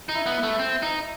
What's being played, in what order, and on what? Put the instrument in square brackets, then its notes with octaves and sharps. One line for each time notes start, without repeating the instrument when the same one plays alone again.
[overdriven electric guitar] D#4
[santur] E4
[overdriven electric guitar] B3
[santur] E4
[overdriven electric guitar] A3
C4
D#4